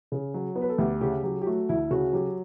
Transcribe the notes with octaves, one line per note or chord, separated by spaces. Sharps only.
C#3
F#3
B3
B4
A4
D2 G4
C#3 G4
F#3 G4
G4
A3 F#4
D2 E4
C#3 F#4
F#3 G4